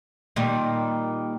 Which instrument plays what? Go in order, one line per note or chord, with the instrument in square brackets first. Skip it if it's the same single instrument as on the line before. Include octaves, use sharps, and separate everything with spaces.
[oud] A#2 D#3 G3